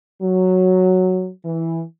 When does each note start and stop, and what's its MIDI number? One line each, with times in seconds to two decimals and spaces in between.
0.22 1.29 54
1.44 1.81 52